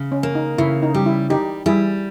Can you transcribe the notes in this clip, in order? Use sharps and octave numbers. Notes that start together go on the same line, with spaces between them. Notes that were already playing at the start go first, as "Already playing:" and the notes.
Already playing: C#3
C#4
A#3
D#4
C#3 E4
D#4
G3 G4
E4
G3 D#4 G4
G3 E4 G#4